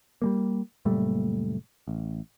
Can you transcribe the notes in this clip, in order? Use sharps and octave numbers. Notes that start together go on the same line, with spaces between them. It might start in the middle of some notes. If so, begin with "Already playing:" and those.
G3 G#3 A#3
F#1 A#2 G3 A3
A1